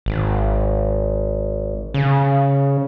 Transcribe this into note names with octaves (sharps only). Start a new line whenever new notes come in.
G#1
C#3